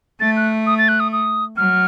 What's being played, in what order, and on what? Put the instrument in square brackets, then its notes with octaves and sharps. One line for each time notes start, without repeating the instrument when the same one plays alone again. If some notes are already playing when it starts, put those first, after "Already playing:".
[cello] A3 [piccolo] A6
[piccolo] F#6
D#6
A6
F#6
D#6
D#6
[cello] F#3 [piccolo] F6